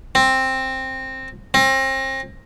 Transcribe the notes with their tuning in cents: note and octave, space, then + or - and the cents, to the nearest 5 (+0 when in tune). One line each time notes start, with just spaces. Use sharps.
C4 +10
C4 +35